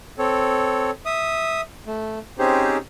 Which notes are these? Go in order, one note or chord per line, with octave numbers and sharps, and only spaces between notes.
C4 A4 C#5
E5 D#6
A3
C4 C#4 D#4 G4 G#4 C5